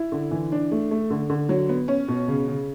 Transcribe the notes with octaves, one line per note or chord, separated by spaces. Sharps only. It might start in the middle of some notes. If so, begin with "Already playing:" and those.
Already playing: E4
D3
E3
D4
A3
A3
D3
D3
F#3
B3
C#4
B2
C#3
C#3